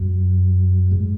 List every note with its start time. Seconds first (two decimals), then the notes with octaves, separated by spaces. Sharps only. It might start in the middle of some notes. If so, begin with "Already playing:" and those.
Already playing: F#2
0.91 G#2